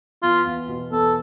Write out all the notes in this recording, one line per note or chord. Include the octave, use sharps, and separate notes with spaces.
E2 F4
E2
B2
E2 A4